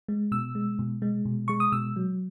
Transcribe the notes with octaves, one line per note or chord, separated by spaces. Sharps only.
G#3
B2 E6
G#3
B2
G#3
B2
G#3 C#6
D#6
B2 E6
F#3